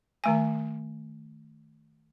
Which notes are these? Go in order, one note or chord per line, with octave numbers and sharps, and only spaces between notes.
D#3 A3 G#5